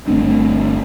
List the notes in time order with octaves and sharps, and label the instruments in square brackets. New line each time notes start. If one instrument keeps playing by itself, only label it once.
[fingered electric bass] G1 A3 C4 D4